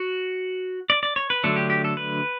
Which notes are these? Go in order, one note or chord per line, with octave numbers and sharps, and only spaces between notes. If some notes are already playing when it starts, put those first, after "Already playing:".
Already playing: F#4
D5
D5
C#5
B4
D3 F#3 A3 D4 A4
G4
G4
A4
B4